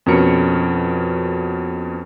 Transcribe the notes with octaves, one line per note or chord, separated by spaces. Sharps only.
F2 B2 C#4 A#4 C#7